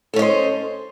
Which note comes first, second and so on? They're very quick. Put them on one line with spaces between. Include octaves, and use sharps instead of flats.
A4 C#4 D#5 C5